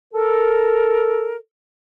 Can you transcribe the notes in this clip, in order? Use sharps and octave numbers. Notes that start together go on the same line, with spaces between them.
A4 A#4